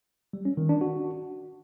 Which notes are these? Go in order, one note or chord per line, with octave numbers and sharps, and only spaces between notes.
G3
C#4
D#3
D4
F#4